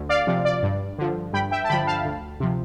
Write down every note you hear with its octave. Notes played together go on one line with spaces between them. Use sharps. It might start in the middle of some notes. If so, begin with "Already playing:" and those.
Already playing: D2
D5 F5
C3 F3
D5
G2
D3 F3
G2 G5 B5
E5 G5
A5
D3 F3 G5 B5
F5 A5
D2
C3 F3